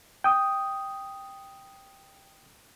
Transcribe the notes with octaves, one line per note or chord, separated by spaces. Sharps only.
G5 D#6